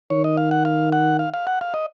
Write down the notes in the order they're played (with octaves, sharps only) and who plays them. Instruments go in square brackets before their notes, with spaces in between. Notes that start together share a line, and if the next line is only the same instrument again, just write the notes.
[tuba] D#3 [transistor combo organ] C#5
[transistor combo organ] D#5
F5
F#5
F5
F#5
F5
F5
F#5
F5
D#5